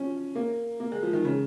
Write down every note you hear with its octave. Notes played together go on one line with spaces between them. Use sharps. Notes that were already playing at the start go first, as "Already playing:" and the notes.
Already playing: F3 C#4
A#3
A#3
G#3
F3
D#3
C#3